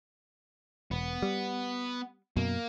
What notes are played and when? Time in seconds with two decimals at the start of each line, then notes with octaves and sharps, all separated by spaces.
0.91 E1 B3
1.22 G3
2.37 F#2 B2 A#3